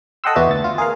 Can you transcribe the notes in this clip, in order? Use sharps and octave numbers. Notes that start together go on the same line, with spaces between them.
A4 D#5 F#5 G5 C6 E6
E2 B3 E4 F#4 D5 E5
D2 A6
F4
G#4 A#4 F5